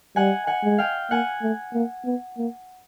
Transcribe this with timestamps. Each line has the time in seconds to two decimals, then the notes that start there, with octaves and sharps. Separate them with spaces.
0.16 G3 F#5 G#5
0.47 F#5 G#5
0.64 G#3
0.78 F5 G5
1.11 A#3 F#5 G#5
1.42 A3
1.74 A#3
2.05 B3
2.38 A#3